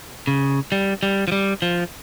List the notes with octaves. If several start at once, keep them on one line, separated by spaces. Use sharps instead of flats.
C#3
G3
G3
F3
G3
F3